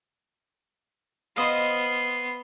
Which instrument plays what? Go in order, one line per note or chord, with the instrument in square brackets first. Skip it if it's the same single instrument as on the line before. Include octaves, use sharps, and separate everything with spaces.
[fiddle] B3 C6 [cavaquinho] C5 D#5 F5